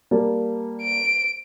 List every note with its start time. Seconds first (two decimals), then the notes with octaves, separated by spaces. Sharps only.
0.11 G3 A#3 A5
0.82 D7